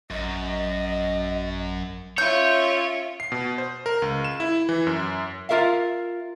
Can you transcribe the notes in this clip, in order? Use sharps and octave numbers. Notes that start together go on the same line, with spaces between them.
A1 F#2 D#5
C#4 F4 C#5 E5 G6
C7
B2
C5
A#4
C#2
E7
E4
E3
F#2
F4 F#4 A#4 E5 F5